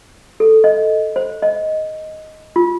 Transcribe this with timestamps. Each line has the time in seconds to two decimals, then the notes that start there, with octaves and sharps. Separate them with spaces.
0.40 A4
0.64 D#5
1.16 C5
1.42 D#5
2.56 F4